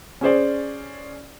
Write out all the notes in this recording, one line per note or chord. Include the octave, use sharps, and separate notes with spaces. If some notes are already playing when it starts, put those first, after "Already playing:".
C#4 G#4 C5 D5